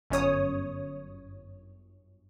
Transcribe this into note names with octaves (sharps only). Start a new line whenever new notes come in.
G1 F#2 C#5 D#6